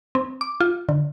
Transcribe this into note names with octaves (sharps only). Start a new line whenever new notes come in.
C4
D6
F4
D3